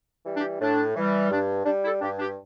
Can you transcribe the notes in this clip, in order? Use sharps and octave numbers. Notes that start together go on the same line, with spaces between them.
E3 G3
D4 G4
A2 D4
E3 G3
G2 D4
G3 D4
E4 A4
G2 D4 G4
D4 G4